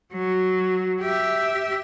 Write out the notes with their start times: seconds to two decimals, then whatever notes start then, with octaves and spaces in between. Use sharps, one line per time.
0.13 F#3
1.01 G4 E5